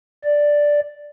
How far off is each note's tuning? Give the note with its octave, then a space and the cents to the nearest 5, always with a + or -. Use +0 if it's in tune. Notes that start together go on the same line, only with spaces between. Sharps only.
D5 +0